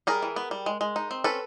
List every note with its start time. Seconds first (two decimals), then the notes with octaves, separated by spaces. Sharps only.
0.07 G3 G#4 A#4
0.22 E3
0.36 B3
0.51 G3
0.66 G#3
0.81 G#3
0.96 D#4
1.11 C4
1.24 C#4 A4 B4